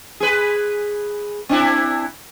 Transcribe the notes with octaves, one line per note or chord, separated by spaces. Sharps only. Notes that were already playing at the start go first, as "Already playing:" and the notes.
G#4 B4
C4 D4 E4